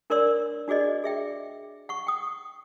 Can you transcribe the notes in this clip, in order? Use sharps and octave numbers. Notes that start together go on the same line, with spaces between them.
D4 A#4 C#5 D5 C6 E6
D4 F#4 G#4 D5 D#5
G#4 E5 G5
F#5 C#6
G5 D#6